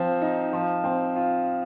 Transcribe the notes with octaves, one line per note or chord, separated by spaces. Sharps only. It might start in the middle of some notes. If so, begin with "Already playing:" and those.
Already playing: F3 C4
D#4
F3
C4
F4